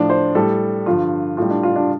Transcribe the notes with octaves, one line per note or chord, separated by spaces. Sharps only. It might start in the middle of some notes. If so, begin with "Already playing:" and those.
Already playing: A2 F3 D4
C5
A2 G3 A4
G2 D3 F3 F4
A2 G3 F4
D4
F4
D4